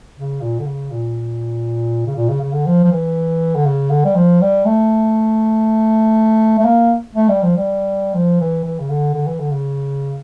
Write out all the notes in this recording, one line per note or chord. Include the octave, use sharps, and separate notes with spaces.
C#3
A#2
D3
C#3
A#2
C#3
A#2
C#3
C#3
D3
F3
F3
E3
D3
C#3
D3
G3
F3
G3
A3
A3
A#3
A3
G3
F3
G3
F3
E3
E3
C#3
D3
D3
E3
D3
C#3